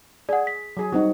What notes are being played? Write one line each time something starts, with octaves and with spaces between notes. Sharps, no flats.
G#4 D5 F#5
B6
F#3 G#4
G3 C4 D#4 F#4